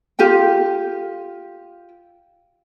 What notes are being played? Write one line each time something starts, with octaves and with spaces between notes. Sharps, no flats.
F4 G4 A4 G5